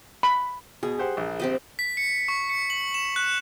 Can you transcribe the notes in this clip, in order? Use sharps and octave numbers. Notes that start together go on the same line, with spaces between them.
B5
B2 G#4
G4 C5 F#5
A#1
C4 G4 D#5
B6
C#7
C#6
C#7
F#7
E7
F#6